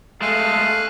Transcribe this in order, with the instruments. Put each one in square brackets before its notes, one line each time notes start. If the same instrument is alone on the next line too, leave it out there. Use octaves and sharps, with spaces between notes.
[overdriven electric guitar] G#3 A3 [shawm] F5 [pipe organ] G#5 A5 F#6